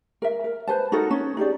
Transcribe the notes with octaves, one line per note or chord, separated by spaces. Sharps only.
A#4 E5
A#4
B4 C5 A5
D#4 F#4 A4 A#4
C#4
D#4 G4 G#4 D5